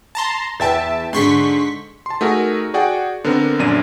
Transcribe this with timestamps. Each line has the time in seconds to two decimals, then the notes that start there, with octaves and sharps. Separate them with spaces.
0.15 A5 A#5 C6
0.60 E2 B4 E5 G5 A5 A6
1.13 G#2 D3 C6 C#6 B6
2.06 A5 C6
2.21 A3 D#4 F#4 G#4 A#4
2.74 F#4 G#4 D5 F#5 G5
3.24 D3 B3 C4 D4 A#4
3.59 A#1 F#2 D4 D#7